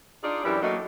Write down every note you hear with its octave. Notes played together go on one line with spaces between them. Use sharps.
D4 D#4 F4 G#4 D5
F#2 E3 G3 E4 G4 D5
F#3 A3 A#3 F#4 D#5